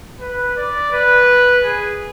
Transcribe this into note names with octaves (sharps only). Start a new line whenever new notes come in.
B4
D5
B4
G#4